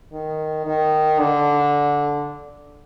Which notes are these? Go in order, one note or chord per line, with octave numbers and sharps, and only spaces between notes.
D#3
D#3
D3